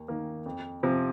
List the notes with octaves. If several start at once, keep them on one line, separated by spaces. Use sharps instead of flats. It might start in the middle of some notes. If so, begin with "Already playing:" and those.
Already playing: D#2
D#3 A#3
F2
C3 F3